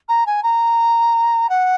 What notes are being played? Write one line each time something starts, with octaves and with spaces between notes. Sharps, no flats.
A#5
G#5
A#5
F#5